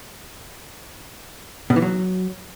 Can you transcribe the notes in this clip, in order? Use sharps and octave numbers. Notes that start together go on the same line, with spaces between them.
B2
E3
F#3